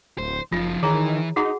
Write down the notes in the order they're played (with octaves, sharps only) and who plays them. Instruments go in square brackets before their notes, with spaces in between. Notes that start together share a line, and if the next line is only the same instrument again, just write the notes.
[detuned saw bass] D1 [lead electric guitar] C5
[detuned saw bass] F#1 [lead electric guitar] F3 D#4 [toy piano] F4
[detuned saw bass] D#3 [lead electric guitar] E3 [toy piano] G#4 C#5 A#5
[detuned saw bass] D#4 [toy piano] F#4 G#4 F#5